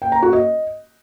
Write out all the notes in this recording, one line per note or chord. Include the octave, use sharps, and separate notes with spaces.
G5
A#5
F#4
D#5